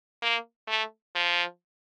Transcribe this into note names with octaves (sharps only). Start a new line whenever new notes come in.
A#3
A3
F3